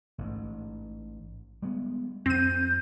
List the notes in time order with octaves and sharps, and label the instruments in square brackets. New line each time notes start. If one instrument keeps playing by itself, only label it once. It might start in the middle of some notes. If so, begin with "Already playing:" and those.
[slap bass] A1 G#2
G3 G#3 B3
[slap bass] F2 [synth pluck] C4 D#7 [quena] G6